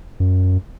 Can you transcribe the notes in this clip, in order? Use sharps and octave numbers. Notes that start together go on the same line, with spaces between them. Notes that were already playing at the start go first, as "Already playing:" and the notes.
F#2